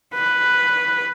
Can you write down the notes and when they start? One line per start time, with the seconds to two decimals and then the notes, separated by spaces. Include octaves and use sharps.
0.14 B4